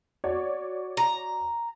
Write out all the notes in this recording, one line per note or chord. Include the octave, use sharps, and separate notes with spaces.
F#4 C#5 D5
A#5